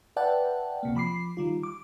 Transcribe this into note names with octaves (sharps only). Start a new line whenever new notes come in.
B4 D5 E5 F#5 G5 A5
C2 C3 A#3
F3 B5 D6 C7
D#3 G3 F4
D6